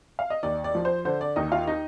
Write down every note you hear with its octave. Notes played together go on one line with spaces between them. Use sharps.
F5
D#5
D#2 D5
D5
F3
C5
D3 C5
D5
D#2 D#4 D#5
F4 F5
D#4 D#5